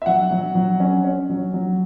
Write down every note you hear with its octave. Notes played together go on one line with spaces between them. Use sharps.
E5
F#3 F#5
F#3
F#3
C#4
C#4
F#3
F#3